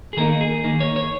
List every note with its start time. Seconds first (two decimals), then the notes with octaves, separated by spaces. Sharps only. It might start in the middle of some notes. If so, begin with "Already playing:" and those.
0.13 G#4
0.17 D#3 A#3 D#4 A#4
0.41 G#4
0.64 D#3 A#3 D#4
0.80 C#5
0.96 C#5